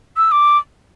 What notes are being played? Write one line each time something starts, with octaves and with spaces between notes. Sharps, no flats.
E6
D6